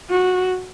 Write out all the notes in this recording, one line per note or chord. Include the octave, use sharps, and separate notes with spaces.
F#4